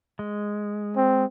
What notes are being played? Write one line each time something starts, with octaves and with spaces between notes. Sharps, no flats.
G#3
C4